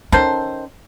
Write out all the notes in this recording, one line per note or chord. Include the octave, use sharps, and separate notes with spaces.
D#3 C#4 A4 C5